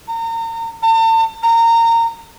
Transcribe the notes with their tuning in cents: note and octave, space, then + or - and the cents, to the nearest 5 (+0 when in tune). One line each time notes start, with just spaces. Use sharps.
A#5 -35
A5 +45
A#5 -20